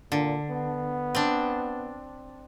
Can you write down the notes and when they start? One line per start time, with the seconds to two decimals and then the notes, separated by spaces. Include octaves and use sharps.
0.12 A#2 D3
0.50 B3
1.15 C4 D4